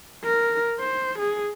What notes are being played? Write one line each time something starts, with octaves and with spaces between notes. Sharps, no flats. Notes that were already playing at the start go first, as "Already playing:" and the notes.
A#4
C5
G#4